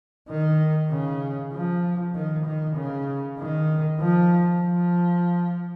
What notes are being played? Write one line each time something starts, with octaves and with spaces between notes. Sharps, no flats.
D#3
C#3
F3
D#3
D#3
C#3
D#3
F3
F3